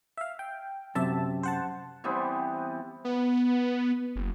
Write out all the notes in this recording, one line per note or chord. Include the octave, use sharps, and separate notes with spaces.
E5 F5
G5
F#2 C3 E5 A5
C5 F#5 A5
E3 G3 B3 C4
B3
F#1